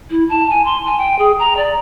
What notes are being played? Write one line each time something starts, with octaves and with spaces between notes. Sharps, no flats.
E4
A5
G#5
C6
G#5
G5
G#4
A#5
D5